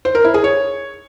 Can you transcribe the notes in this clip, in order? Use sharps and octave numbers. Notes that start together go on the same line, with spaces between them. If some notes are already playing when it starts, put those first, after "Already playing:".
C5
A#4
E4
G#4
C#5